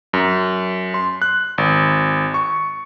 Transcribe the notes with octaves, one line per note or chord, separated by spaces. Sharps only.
F#2
C6
F#6
G#1
C#6